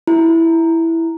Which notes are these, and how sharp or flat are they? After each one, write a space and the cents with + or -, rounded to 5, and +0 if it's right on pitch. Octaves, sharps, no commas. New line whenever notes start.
E4 +0